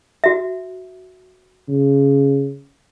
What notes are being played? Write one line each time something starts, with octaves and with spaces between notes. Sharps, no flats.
F#4 E5
C#3